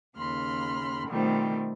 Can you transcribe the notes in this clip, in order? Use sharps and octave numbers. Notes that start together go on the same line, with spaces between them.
D#2 C#3 B5 C6 F6
B2 D#3 F3 G3 A3 C4